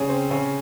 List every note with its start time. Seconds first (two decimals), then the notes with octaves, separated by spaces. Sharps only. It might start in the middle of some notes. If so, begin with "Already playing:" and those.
Already playing: C#3 C#4
0.09 C4
0.30 C#3 C#4